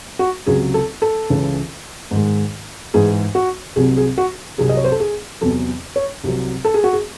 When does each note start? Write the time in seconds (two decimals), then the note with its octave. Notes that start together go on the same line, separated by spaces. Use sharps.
0.19 F#4
0.47 C#2 C3 F#3 G#4
0.74 A4
1.02 A4
1.30 C#2 C#3 E3
2.11 G#2 D#3 G#3
2.94 G#2 E3 G#3 G#4
3.35 F#4
3.76 C2 C3 F#3 G#4
3.97 G#4
4.18 F#4
4.58 C2 C3 F#3 G#4
4.69 D#5
4.77 C#5
4.84 C5
4.92 A4
5.00 G#4
5.41 E2 C3 F#3 A4
5.96 C#5
6.24 C2 C3 F#3
6.65 A4
6.74 G#4
6.84 F#4
6.93 G#4